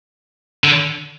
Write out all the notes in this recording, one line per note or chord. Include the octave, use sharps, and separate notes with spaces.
D3